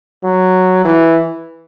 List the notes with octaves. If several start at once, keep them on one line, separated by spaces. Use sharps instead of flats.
F#3
E3